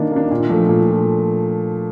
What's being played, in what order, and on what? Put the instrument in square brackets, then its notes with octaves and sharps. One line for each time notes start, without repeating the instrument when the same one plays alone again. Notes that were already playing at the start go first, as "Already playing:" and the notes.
Already playing: [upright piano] D#3 A#3 D4
A#3 D4
A#2
F3 A3
A#2